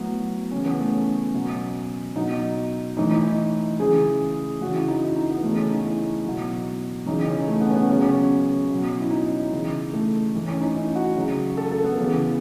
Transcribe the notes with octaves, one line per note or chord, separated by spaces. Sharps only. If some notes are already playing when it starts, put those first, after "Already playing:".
Already playing: A2 F#3 B3
C#3 E3 C#4
B3
A3
C#4
B2 F#3
B2 F#3 D#4
A2 E3 D#4
D#4
E4
C#3 E3 G#4
C#3 E3 F#4
E4
D#4
E4
D#4
B3
C#3 E3 A3
C#4
D#4
E4
B2 F#3
C#3 E3 D#4
C#4
A3
B3
C#4
B3
C#3 F#3 C#4
C#4
B2 F#3
E4
D#4
C#3 E3
A3
A2 E3
C#4
D#4
E4
F#4
C#3 F#3
A4
A4
B3
C#3 E3